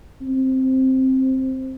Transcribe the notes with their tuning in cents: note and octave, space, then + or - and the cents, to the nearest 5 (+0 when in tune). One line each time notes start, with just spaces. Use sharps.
C4 +5